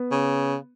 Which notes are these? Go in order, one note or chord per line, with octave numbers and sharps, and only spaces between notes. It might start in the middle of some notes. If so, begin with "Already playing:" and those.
Already playing: B3
C#3